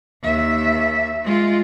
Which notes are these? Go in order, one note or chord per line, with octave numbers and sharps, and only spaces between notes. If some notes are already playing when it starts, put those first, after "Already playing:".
D#2 E5
G#3 F4